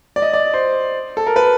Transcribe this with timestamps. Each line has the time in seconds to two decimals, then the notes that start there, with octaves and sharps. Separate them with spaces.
0.16 D5
0.22 D#5
0.34 D5
0.54 C5
1.17 A4
1.27 A#4
1.36 B4